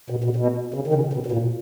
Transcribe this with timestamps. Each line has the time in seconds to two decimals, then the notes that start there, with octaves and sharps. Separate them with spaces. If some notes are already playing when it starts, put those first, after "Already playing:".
0.10 B2
0.24 B2
0.36 B2
0.74 C#3
0.87 D#3
0.94 C#3
1.13 B2
1.26 B2
1.32 A#2